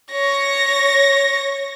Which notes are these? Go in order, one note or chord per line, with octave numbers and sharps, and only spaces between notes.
C#5 A#6